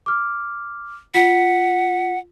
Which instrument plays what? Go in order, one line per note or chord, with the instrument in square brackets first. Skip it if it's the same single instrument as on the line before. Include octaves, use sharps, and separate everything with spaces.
[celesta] D6 F6
[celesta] F4 B6 [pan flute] F#5